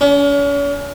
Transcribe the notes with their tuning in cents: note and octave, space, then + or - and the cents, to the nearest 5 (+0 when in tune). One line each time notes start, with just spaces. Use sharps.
C#4 +40